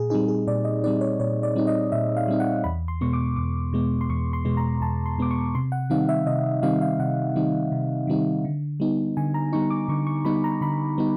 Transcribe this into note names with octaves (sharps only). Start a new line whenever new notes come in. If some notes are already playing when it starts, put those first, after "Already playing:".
Already playing: A#2 G#4
G3 C4 D#4 G#4
G#4
A#2 D5
D#5
G3 C4 D#4 D5
C#5
A#2 C#5
D5
G3 C4 D#4
D#5
A#2 E5
F5
G3 C4 D#4
F#5
E2 B5
C6
B2 G#3 B3 C#6
D6
E2 D6
B2 G#3 B3
C6
E2 C#6
C6
B2 G#3 B3
A#5
E2 A5
C6
B2 G#3 B3 D6
C#6
C3 C6
F#5
D#3 G3 C4 D#4 F5
E5
C3 D#5
D#3 G3 C4 D#4 F5
F5
C3 F#5
D#3 G3 C4 D#4
C3
D#3 G3 C4 D#4
D3
G3 B3 D#4
D3 G#5
A#5
G3 B3 D#4 C#6
D6
D3 C#6
C#6
G3 B3 D#4 B5
A#5
D3 B5
G3 B3 D#4